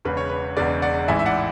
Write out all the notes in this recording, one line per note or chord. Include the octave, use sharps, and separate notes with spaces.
E1 E2 C#3 B4
C#5
B4
E1 E2 C#3 B4 D5
D5 F#5
A1 G#2 E3 E5 G#5
E5
D5 F#5